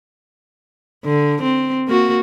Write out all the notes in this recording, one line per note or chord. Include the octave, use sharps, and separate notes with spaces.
D3
C4
A#3 F#4